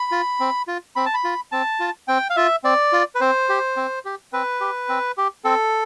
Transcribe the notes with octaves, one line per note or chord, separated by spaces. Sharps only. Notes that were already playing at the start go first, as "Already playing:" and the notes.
Already playing: B5
F4
C4
F4
C4 B5
A5
B5
F4
C4 A5
F4
C4 G5
F5
F4 E5
C4 D5
F4
B4
C4 C5
G4
C4
G4
C4 B4
G4
C4
G4
C4 A4